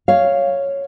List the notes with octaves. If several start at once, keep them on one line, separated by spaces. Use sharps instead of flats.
C#5 F5